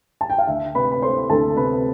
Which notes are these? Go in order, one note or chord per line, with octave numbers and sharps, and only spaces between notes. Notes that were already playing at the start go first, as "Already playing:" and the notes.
A5
G5
F5
D2 E5
C3 B4 B5
B5
A3 C5 C6
D2 A4 A5
C3 B4 B5